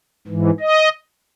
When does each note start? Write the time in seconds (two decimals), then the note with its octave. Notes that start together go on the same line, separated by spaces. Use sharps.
0.27 G#2 E3
0.60 D#5